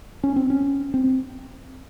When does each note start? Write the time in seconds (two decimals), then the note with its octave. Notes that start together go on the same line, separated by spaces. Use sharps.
0.24 C#4
0.36 C4
0.50 C#4
0.94 C4